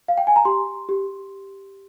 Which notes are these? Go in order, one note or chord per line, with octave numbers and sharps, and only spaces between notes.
F5
G5
G#5
A#5
G4 C6
G4